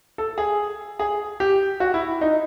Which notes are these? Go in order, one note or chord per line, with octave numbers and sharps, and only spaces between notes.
A4
G#4
G#4
G4
F#4
E4
D#4